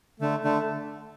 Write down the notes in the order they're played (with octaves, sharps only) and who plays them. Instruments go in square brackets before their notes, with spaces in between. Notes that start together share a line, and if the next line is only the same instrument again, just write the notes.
[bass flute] D3 [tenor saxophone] A3
[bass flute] D3 [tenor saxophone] A3